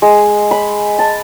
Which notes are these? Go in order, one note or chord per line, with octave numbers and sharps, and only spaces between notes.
G#3
B5
A5